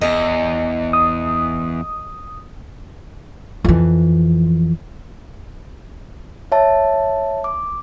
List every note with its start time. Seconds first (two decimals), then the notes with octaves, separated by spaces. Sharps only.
0.01 E2 D#5
0.93 D#6
3.64 F2 E3
6.52 C#5 E5 A5
7.44 D6